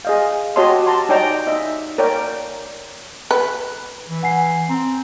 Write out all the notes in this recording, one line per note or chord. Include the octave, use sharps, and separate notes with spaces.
G#4 D#5 F5
F#4 G4 C#5 D#5 A5 C6
A5 A#5 C6
D#4 C#5 D5 G5 A#5
D#4 D#5 E5
A#4 C#5 D5 G5
B4
E3
F#5 G#5 C7
C4 A#5